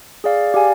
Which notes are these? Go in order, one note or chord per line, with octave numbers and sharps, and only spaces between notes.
G#4 D5 F5
G4 D5 F5 G#5